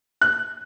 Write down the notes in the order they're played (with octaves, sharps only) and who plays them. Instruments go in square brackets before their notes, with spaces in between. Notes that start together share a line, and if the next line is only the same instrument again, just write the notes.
[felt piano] F#6